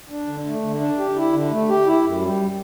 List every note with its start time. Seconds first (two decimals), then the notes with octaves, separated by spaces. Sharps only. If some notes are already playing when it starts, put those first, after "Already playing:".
0.10 D4
0.27 D3
0.46 A3
0.63 D3
0.80 D4
0.98 G4
1.16 E4
1.33 D3
1.51 A3
1.69 G4
1.86 E4
2.04 F#2
2.22 G3